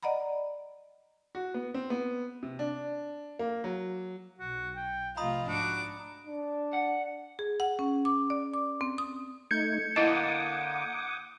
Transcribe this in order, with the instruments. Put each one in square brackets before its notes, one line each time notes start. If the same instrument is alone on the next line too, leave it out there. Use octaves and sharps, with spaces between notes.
[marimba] D5 D#5 F#5 A#5 B5
[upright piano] F#4
B3
C4
B3
C3
D4
A#3
F#3
[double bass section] B1 [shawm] F#4
[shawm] G5
[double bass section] C3 F3 A3 [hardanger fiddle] F4 [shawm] D#5 [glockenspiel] A#5 B5 D#6
[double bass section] G#2 [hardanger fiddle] D4 D6 [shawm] F#4
[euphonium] D4
[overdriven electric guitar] F#5
[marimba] G#4
F#5
C#4
D6
D5
D6
C4
D#6
[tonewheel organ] A3 D#4 [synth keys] G6 G#6 C#7
[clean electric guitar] D3 A#3 A5 [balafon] E4 D#5 [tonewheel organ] F#5 D6 D#6